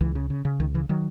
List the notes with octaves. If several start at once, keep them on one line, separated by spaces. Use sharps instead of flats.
C#2 E3
C#3
C#3
C#3
C#2 D#3
C#3 E3
D#3 F#3